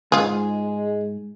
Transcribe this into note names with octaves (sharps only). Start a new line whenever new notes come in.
D2 G#2 G#3 F4 G#4